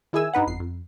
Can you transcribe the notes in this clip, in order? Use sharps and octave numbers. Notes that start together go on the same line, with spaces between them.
D#3 E4 G#4 G#5 E6
G2 D#4 B4 F#5
G1 F2 C7
F2